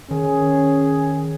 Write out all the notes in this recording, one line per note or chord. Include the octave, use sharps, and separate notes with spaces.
D#3 C#4 G#4